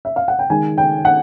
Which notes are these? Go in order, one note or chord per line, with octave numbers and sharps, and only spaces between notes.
E5
F5
F#5
G5
D#3 G#3 G#5
G5
F#5